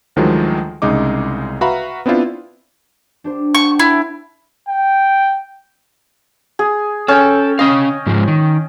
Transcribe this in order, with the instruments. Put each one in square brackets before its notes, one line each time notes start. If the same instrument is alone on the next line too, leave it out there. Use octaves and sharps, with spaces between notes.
[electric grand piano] D2 D#3 F3 F#3 G#3
C2 C#3 G#3 D#4 D6
F#4 B4 E5 F5 A#5 B5
B3 C4 D4 E4 F4 C5
[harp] D4 G4 C5
[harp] F#5 G5 A5 [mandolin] C#6
[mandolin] E4
[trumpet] G5
[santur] G#4
[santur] C#4 G5 [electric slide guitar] A4
[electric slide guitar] C#4 F5 [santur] D#5
[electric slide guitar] G#2 F3 G#3
D#3